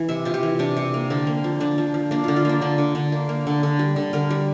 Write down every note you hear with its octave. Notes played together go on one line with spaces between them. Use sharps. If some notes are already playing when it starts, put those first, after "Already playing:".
Already playing: E3
C3 E5
C3 F4
G4
E3
C3 D4
C3
A#3
D3 C4
A#3
F3
D3 D4
F3
F3
A#3 D4
D3 F4
F4
A#3 D4
D3 D4
D3
D3
A#3
A#3
D3
D3
G3
D3
D3 A#4
G3